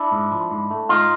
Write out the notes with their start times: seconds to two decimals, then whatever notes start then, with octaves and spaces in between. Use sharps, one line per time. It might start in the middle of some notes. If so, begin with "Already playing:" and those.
Already playing: D4 E4
0.12 G#2
0.32 F3
0.51 G#2
0.71 A3
0.89 G#2 D#4 F4